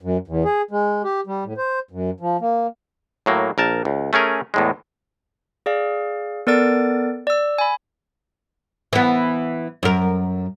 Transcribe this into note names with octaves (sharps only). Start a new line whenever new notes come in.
F#2
E2
G#4
G#3
G4
G3
A2
C5
F#2
F3
A#3
A2 F#3 A#3
A#1 A#4 A5
C#2
A3 C#4 G#4 A#4
E2 A2 G#3
G#4 D5 F5
B3 A4 A#4 D5 A6 D7
D5 E6
G#5 B5
E3 B3
F#2 A#4